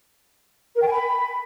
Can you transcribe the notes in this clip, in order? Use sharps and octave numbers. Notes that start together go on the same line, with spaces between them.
A#4
G5
G#5
B5